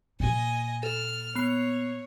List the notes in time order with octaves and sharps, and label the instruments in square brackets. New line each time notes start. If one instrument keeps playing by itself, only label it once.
[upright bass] A#2 A#3 [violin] D#5 G#5
[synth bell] A4 [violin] F6
[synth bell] B3 C7 F7 [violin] C#5